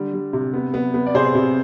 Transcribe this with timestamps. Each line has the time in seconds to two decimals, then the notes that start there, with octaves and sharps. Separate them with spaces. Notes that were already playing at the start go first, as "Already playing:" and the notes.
Already playing: D3 G3
0.13 G3
0.33 C3
0.54 B3
0.74 B3
0.94 B3
1.06 D5
1.14 C3 G#4 C5
1.35 C3